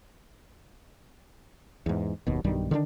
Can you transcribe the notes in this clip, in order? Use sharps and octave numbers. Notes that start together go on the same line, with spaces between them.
E2 G#2
F#1 D#2 B2
B1 G2 D#3 G3
D3 D#3 G3 D4